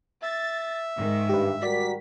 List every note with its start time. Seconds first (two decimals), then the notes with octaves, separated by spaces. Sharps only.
0.22 E5 A6
0.95 G#2 D#3
1.29 G2 G4 B4
1.63 G3 F#4 A#4 D5 B6